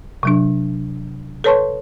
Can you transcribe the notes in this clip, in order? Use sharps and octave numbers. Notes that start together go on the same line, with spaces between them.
C3 F#3 D4
A4 B4 C#5 A5 C6 C#6